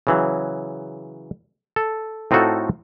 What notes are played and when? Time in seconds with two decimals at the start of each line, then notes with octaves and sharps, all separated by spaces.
0.07 C#3 E3 F#3
1.76 A4
2.31 A2 C4 D#4 F4 F#4 A4